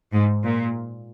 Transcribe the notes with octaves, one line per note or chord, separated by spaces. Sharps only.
G#2
A#2